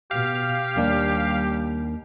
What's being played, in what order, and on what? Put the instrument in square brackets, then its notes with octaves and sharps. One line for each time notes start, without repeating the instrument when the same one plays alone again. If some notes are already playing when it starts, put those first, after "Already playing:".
[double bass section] B2 [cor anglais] G4 [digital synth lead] F5
[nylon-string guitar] D#2 A#3 D4 [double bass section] G3